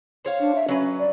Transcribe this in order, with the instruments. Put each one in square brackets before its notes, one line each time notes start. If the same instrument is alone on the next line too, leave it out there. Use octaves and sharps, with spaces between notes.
[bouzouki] C5 C#5 F5
[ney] D4
E5
[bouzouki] F#3 B4 [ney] C#4
[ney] D5